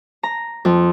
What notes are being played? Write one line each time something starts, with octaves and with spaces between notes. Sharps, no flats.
A#5
F2